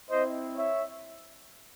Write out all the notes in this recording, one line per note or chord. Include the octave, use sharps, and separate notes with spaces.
C4 E4 C5 D#5
C#5 E5